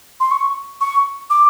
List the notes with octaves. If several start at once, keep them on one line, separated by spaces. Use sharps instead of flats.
C6
C#6
C#6
D6